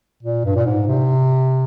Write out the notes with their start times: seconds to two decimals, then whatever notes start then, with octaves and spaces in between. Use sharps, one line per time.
0.23 A#2
0.45 G2
0.56 A#2
0.66 G#2
0.87 C3